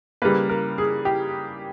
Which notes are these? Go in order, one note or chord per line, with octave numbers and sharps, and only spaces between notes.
C#3 G3 A#3 B4
A#4
G#4
G4